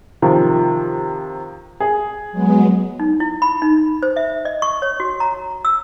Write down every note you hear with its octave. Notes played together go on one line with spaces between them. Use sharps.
C3 D#3 F3
G#4
F#3 G#3 B3
D#4
E4
B5
D#4
C5
E5
D#5
C#6
C#5
F#4
A#5
E6